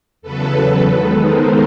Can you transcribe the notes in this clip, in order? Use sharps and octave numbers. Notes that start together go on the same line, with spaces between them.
E2 C#3 F#3 A4 B4
D#3 G#3 B3 D#4 A4 B4
A#4 C5